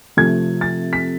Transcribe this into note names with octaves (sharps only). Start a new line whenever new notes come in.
C3 F3 A3 G#6
A6
B6